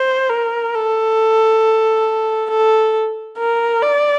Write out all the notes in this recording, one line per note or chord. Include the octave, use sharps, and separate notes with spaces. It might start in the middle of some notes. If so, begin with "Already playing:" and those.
Already playing: C5
A#4
A4
A4
A#4
D5